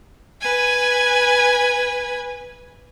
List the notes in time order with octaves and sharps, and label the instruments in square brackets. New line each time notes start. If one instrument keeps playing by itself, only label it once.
[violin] B4 G#5